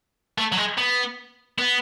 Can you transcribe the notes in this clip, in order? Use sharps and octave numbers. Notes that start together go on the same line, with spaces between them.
A3
F#3
G#3
B3
B3